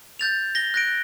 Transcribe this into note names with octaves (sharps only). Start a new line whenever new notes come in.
G6 A6 F7
A#6 G7
F#6 A#6 D7